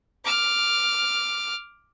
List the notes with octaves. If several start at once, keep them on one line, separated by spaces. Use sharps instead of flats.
D6 F6